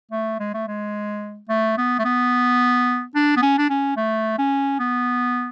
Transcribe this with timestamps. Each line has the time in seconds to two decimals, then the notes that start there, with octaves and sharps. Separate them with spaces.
0.12 A3
0.40 G#3
0.54 A3
0.68 G#3
1.49 A3
1.78 B3
1.99 A3
2.05 B3
3.15 D4
3.37 B3
3.42 C#4
3.58 D4
3.70 C#4
3.97 A3
4.38 C#4
4.79 B3